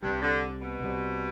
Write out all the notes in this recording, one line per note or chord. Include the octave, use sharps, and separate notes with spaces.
C2 G2 C3 G3
D3
B2
C2 C3 G3